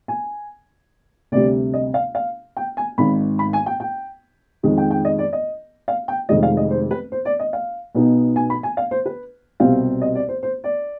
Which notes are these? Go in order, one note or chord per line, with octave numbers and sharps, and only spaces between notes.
G#5
D2 C3 G3 D5
D#5
F5
F5
G5
G#5
G#1 G#2 D#3 B5
B5
G#5
G5
G5
F2 D#3 G#3
G5
G5
D#5
D5
D#5
F5
G5
F1 F2 D#3 G#3 D#5
F5
D#5
C5
B4
C5
D5
D#5
F5
B1 B2 B3 D#4
G#5
B5
G#5
F5
C5
B4
C2 B2 G3 C4 F5
D#5
D5
C5
C5
D5